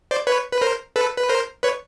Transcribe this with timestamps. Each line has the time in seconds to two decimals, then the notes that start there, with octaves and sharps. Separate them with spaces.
0.11 C5 D5
0.27 B4 C#5
0.52 B4
0.61 A#4 C5
0.96 A4 B4
1.18 B4
1.29 A#4 C5
1.63 B4 C#5